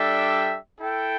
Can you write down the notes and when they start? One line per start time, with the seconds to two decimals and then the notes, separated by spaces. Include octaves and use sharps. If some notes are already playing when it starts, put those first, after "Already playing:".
Already playing: G3 D4 A4 E5 G5
0.79 E4 A4 G5